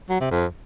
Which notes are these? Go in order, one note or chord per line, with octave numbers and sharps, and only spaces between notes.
F#3
C3
F2